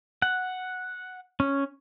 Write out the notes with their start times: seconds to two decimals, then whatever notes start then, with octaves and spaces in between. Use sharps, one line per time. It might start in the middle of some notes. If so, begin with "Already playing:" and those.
0.22 F#5
1.40 C#4